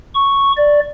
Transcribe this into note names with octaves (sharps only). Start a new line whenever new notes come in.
C#6
D5